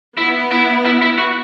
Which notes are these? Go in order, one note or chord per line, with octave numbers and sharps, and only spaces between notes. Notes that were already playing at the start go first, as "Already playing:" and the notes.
B3 E4
E4
E4
E4
F#4